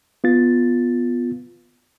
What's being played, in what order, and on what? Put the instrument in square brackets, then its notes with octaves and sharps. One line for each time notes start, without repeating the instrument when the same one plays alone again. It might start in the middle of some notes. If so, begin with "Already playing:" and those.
[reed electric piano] B3 F4 A6